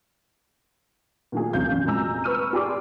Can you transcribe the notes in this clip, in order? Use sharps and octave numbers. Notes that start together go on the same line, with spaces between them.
A#2 D#3 F#3 A3 D4 G#4
C2 C#3 F#3 F5 G6
F#2
F1 A#2 G#3 G#5 A#5 E6
B4 C#6 E6 F6 D#7
G4 G#4 D5 C6 D6